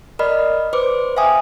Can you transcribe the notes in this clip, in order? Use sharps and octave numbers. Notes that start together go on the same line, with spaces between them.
A#4 D5 D#5 B5 F6
B4 C5 D6
E5 F5 G5 G#5 D#6